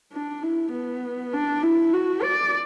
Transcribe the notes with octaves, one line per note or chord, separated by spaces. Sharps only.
D4
E4
B3
D4
E4
F#4
D5